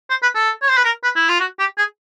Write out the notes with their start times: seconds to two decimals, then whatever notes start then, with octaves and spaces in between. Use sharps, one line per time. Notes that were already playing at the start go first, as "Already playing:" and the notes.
0.10 C5
0.22 B4
0.35 A4
0.62 C#5
0.69 C5
0.77 B4
0.85 A#4
1.03 B4
1.16 E4
1.28 F4
1.40 F#4
1.59 G4
1.78 G#4